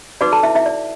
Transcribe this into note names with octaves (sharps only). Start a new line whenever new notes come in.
D#4 F#4 B4 D5 D6
A4 A5
E4 E5
E4 E5
D5